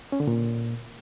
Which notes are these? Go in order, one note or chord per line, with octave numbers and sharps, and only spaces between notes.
C#4
D3
A#2